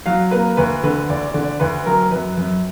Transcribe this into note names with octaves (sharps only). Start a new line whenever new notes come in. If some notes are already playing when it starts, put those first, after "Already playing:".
F#3 F5
A#3 B4
D2 B4
D3 B4
D2 D5
D5
D3
D5
D2 B4
F#3 A#4
F#2 B4
F#2